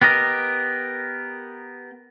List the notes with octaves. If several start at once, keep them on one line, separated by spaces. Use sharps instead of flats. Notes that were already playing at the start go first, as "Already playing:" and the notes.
B3 G4 A#4 D#5